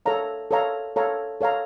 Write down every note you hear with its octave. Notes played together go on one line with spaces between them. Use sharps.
A4 C#5 F5 A#5
A4 C#5 F5 A#5
A4 C#5 F5 A#5
A4 C#5 F5 A#5